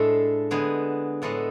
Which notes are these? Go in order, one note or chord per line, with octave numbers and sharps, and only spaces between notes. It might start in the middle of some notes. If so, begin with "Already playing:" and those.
Already playing: A2 G#3 D4 A4
D3 G#3 B3 G#4
A2 G#3 B3 D4 A4